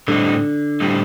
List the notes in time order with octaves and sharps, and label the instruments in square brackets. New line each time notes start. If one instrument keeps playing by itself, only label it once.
[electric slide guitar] A2 G3 C4 D#4 [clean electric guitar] D3
[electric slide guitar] A2 G3 C4 D#4